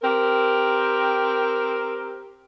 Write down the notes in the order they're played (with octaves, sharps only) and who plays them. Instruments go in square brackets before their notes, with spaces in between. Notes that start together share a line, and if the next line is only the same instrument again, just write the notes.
[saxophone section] C4 G4 A#4